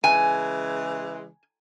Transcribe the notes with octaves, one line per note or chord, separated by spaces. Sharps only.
C#3 E3 G#3 G#5